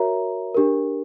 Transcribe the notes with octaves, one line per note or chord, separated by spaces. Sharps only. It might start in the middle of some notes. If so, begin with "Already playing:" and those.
Already playing: F#4 A#4 C#5 E5 A#5
D4 G4 A#4